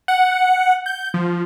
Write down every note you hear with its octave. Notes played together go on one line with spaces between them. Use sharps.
F#5
G6
F3